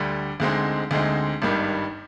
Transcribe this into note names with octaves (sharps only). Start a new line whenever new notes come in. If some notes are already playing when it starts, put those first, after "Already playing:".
Already playing: D2 D3 G3
D2 D3 G#3 C4 D#4
D2 D3 G#3 C4 D#4
G#1 G2 D#3 G3